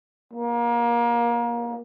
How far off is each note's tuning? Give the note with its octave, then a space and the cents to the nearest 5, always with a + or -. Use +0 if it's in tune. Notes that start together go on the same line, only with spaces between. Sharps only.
A#3 +25